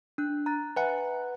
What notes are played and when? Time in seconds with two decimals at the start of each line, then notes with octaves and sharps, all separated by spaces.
0.18 D4 F#6
0.46 A#5 F#6 A6
0.76 B4 E5 F#5 G#5 A#5